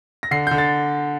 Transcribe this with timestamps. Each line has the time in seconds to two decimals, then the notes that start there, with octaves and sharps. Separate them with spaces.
0.23 A#6
0.31 D3 C7
0.47 D3 G6
0.58 A6